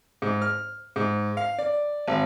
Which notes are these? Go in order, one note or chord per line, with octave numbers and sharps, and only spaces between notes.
G#2
F6
G#2
F5
D5
G#1